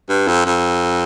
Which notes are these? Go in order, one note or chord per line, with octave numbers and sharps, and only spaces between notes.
G2
F2
F2